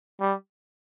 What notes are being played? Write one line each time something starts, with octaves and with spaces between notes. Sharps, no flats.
G3